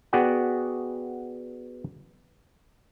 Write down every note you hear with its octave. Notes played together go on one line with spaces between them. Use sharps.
B3 F#4 G#4 D5 F#5 G5